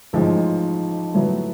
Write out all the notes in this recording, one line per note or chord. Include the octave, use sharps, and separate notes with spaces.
A1 G#2 F3 G#3
A2 F#3 B3